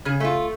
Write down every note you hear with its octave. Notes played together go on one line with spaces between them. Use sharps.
C#3 G#4
A3 F4